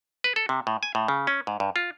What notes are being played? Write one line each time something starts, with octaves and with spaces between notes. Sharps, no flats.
B4
A4
C3
A2
G#5
A2
C#3
C#4
G#2
G2
F4